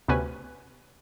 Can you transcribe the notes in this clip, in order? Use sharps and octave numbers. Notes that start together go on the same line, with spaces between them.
D2 C3 B3 C#4 B4 G#5